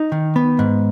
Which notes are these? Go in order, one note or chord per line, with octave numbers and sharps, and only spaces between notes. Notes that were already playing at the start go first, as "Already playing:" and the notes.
Already playing: D#4
D#3
B3
G#2